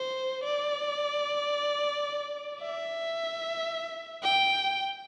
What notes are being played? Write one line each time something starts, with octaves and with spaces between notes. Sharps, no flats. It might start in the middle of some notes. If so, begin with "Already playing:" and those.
Already playing: C5
D5
E5
G5